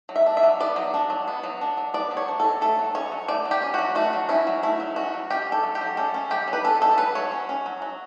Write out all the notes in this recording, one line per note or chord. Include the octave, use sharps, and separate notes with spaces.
F#3
E5
D4
E5
F#3
B3 D5
F#3
D4
F#3
B3
F#3
D4
F#3
B3 D5
F#3
C#5
D4
F#3 A4
A3 A4
F#3
C#4 C#5
F#3
A3 D5
F#3
G4
C#4
F#3 F#4
A3 F#4
F#3
C#4 E4
F#3
A3 E4
F#3
C#4 F#4
F#3
C#4 G4
C#4
A4
F#3
G4
F#3
C#4 A4
C#4
F#3 G4
F#3
B4
C#4 A4
C#4 A4
F#3 B4
F#3 C#5
C#4
C#4
F#3
F#3